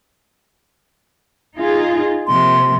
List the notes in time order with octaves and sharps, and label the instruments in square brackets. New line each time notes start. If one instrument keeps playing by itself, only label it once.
[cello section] D#4 F4 G#4
[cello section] C3 F3 A#3 [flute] C6